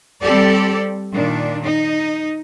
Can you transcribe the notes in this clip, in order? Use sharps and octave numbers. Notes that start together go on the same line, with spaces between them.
G3 C4 G4 A4 D5
A#2 D#3 D4
D#4